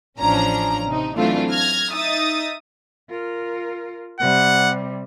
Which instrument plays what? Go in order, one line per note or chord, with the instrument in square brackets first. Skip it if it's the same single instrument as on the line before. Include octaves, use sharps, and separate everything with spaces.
[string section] A1 F3 C#4 D4 A#5
C3 D#4
E3 F#3 A3 C4 D4 F4
F6 G#6 A#6
D#4 E5 D#6 A6
[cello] F4 A#4
[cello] C3 G3 [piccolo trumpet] F#5